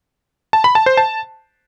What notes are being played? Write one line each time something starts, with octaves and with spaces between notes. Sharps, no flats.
A5
B5
A5
C5
A5